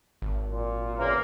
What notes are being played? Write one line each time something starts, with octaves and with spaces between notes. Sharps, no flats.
G#1
A#2
E2 C#3 A#3